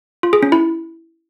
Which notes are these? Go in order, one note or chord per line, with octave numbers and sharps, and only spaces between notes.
F4
G#4
C#4
E4